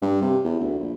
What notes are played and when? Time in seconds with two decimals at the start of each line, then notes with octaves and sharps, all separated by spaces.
0.02 G2
0.22 C3
0.45 E2
0.61 D2
0.79 A#1